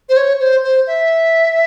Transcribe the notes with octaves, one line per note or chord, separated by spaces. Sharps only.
C5
C#5
C5
C5
E5